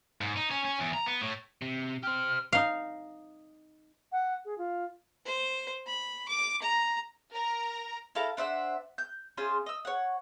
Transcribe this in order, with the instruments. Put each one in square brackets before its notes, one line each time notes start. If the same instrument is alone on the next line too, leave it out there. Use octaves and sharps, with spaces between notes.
[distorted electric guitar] G#2
D#4
C#4
C#4
E2
A#5
B3
A2
[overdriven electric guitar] C3
[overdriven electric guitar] G4 C5 [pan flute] F6
[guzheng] D#4 F5
[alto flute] F#5
G#4
F4
[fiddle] C5
B5
D6
A#5
[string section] A#4 A#5
[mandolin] E4 A4 F5 A#5
D4 C5 E5 F#5
G6
C#4 F4 G#4 C5
D#5 E6
C#5 F#5